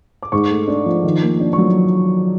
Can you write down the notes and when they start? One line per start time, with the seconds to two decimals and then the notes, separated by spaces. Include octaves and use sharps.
0.23 D6
0.32 G#2 C#6
0.50 A3
0.68 D4
0.86 F3
1.04 D#3
1.22 A#3
1.40 D4
1.53 C#6
1.58 F#3